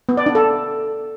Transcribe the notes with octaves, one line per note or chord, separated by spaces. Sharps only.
B3
D5
D4
A4